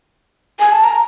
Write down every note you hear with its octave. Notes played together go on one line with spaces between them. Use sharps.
G#5
A5
A#5